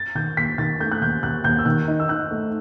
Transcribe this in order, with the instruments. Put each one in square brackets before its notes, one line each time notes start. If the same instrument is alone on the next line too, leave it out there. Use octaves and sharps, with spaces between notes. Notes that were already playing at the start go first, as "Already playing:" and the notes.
Already playing: [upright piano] A6
[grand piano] D#3 [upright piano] G6
[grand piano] D#2 [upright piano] B6
[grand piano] D#3 [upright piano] A6
[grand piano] A3 [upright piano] G6
[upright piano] F#6
[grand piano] D#2 [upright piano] G6
[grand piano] D#2 [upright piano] F#6
[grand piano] D#2 [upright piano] G6
[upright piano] E6
[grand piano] D#3 [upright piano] F#6
[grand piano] D#4
[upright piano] E6
[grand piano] D#4 [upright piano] F#6
[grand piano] A3